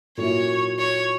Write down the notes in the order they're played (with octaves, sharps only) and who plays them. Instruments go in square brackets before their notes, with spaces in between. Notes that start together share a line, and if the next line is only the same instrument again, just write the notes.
[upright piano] A#2 F#3 A#3 E4 [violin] C#5
[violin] C#5